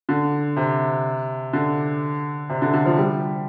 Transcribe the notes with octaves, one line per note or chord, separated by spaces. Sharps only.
D3
C3
D3
C3
D3
D3
F3
G3